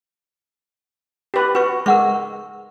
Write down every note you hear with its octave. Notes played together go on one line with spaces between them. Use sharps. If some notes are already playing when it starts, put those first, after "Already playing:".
G4 B4
F#4 B4 C#6
G#3 A#4 F#5 C#6